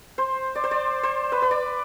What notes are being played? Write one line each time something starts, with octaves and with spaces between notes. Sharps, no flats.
C5
D5
C5
D5
C5
B4
B4
D5